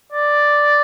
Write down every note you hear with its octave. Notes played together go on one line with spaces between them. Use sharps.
D5